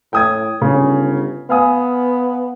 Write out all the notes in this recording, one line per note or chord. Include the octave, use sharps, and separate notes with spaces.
A2 G5 D#6 G#6
G1 C#3
B3 F5 G#5 D#6